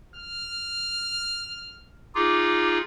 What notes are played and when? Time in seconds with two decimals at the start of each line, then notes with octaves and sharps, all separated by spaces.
0.16 F6
2.15 D#4 F4 G#4 D6